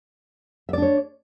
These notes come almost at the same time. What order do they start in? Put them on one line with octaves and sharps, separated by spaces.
E5 D5 D4 C#5